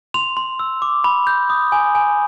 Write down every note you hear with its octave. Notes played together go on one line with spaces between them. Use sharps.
C6 F7
C6
E6
D6
B5
G6
D#6
G#5
G#5